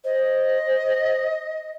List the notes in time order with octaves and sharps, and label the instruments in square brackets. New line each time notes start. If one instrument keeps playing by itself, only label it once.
[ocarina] C5 [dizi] D#5